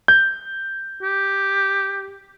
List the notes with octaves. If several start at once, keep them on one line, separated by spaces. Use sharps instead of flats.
G6
G4